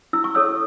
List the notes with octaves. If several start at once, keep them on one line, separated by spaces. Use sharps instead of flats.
E4 E6
C#6
A4 C#5 E6